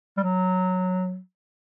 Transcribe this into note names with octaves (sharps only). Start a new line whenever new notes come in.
G3
F#3